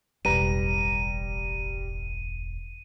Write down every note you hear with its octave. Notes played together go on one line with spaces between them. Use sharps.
E1 A1 G3 B4 A#5 D#7